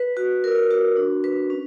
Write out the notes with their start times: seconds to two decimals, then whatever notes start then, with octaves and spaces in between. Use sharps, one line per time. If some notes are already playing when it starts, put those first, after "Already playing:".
Already playing: B4
0.17 F#4
0.44 A#4
0.71 F#4
0.96 D4
1.24 B4
1.50 C#4